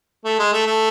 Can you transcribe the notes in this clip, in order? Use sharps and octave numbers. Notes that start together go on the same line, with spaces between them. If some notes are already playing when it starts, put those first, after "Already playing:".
A3
G#3
A3
A3